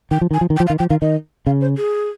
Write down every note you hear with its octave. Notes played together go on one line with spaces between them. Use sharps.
D#3 G5
F3
D#3 G#5
F3
D#3
G5
F3
F5
D#3
F3 G5
D#3 F5
D#3 D#5
C#3 F5
C5
G#4